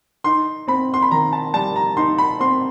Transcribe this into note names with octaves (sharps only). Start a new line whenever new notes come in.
D#4 C6
C4 B5
C6
B5
D#3 A#5
A5
G3 A5
A#5
D#4 C6
B5
C4 C6